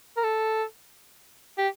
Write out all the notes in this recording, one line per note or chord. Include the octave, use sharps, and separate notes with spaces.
A#4
A4
G4